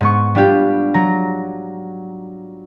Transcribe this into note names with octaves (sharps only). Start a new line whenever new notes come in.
G#2 B3 C#6
G3 D4 F4 G4
F#3 A#5